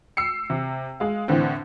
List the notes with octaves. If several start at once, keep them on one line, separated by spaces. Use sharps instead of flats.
E6 C7 C#7
C3
G#3 F5
A2 D3 E3 C4